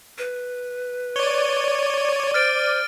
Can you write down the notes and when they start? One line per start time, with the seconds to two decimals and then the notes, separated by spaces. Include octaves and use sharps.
0.18 B4
1.16 C#5 D5 D#7 G7
2.34 C5 F6 A6 D7